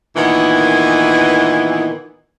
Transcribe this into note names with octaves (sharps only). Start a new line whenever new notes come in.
A#2 D#3 E3 B3 D#5 G#5